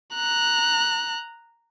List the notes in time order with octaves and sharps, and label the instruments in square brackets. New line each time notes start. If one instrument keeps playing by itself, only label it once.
[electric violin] A#5 F#6